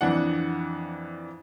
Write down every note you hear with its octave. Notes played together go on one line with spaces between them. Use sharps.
F2 E3 D4 F#5